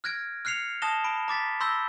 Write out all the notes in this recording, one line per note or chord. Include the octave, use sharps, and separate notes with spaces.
F6 F#6 G#6 A#6 D7
F6 F#6 C7 C#7 F7
A5 D#6 F#6 A#6 E7 G7
B5 D7
A#5 D6 A6 B6
B5 C6 E6 G6 A#6 G7